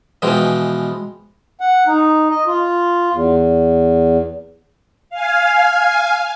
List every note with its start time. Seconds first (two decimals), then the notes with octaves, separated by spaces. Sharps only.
0.22 B2 E3 F3 G#3 G5
1.60 F#5
1.87 D#4
2.30 D#5
2.47 F4
3.13 E2
5.10 F5 G#5